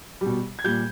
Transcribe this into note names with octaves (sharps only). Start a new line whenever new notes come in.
B2 G3
G#6
A#2 G3 G6